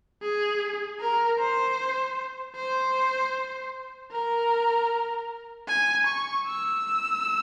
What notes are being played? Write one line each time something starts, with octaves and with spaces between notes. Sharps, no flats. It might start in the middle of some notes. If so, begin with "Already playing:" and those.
G#4
A#4
C5
C5
A#4
G#5
C#6
E6